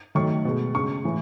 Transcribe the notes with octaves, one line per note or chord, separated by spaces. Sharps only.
D#3 F#3 A3 C#6
B2 G#3
C#3 G#3 C#6
A2 E3